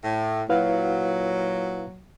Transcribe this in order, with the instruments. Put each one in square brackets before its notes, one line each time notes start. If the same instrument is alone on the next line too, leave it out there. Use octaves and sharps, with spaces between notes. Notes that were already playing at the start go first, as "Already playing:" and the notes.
[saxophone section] A2
[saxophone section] A#2 F#3 [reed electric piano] E4 B4 F5